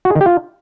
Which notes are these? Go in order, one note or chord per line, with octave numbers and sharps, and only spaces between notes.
F#4
G#4
D#3
G4
F4